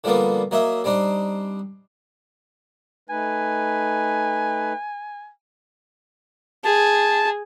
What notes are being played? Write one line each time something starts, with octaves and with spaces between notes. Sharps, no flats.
D3 F3 G3 A#3 B3
F#3 A#3 D#5 E5
G3 C4 D4 D#4
A3 D#4 B4 G#5
G#4 A5